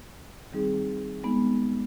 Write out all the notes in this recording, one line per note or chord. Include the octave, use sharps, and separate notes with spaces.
D#3 G3 C4 D#4 G#4
G#3 B3 D#4